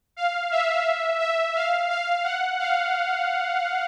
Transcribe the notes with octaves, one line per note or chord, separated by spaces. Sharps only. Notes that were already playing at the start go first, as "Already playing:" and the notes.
F5
E5
E5
F5
F5
F#5
F5